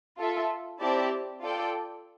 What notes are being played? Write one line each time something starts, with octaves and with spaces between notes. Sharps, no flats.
F4 A4 E5
C4 E4 G4 D5 A5
F4 A4 D5 G5